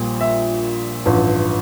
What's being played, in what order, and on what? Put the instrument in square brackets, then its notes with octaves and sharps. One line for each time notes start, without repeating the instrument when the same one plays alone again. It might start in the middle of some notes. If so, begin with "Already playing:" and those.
Already playing: [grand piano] A#1 A#2 G3
E5
A1 G2 F3